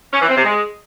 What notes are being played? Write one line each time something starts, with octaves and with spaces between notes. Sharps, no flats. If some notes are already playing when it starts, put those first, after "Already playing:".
C#4
E3
C4
C3
G#3